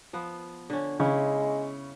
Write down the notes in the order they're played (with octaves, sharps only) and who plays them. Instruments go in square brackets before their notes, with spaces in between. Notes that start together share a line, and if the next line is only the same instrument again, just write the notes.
[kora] F3 B3
D3 C#4
[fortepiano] C#3 [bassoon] G#3 [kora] C#4 E4